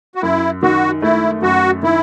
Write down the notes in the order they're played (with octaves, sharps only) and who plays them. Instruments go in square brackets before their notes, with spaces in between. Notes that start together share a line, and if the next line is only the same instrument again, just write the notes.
[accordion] F#4
[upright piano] F#2 [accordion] E4
[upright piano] D#3 [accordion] F#4
[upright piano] A3 [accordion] E4
[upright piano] F#2 [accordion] F#4
[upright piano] D#3 [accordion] E4